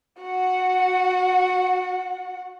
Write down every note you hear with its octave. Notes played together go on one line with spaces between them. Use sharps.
F#4 F#5